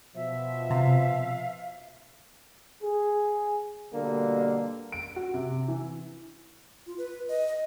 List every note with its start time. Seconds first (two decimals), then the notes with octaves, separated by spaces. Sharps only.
0.15 B2 F3 E5
0.70 C3 F5
2.82 G#4
3.93 B2 D3 G3 A#3
4.92 D7
5.16 F#4
5.34 C3
5.68 E3
6.87 F4
6.98 B4
7.28 D#5
7.48 D#5